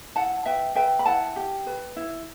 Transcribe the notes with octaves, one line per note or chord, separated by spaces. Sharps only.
E4 F#5 A5
B4 E5 G5
B4 E5 G5
B5
E4 F#5 A5
G4
B4
E4